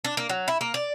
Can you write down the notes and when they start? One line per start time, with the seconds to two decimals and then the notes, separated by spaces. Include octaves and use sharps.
0.04 D4
0.17 A#3
0.29 F#3
0.48 E4
0.61 A#3
0.74 D5